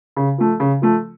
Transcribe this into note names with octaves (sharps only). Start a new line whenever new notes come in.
C#3
F3 A3
C#3
F3 A3